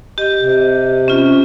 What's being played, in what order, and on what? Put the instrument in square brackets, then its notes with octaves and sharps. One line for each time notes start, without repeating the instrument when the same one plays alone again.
[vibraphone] G4 D#5
[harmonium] C3
[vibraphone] C#4 F4